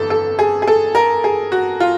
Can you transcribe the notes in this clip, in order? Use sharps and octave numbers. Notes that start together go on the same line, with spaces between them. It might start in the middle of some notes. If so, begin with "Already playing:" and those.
Already playing: G1 F2 E3 A4
A4
G#4
G#4
A4
A#4
G#4
F#4
F4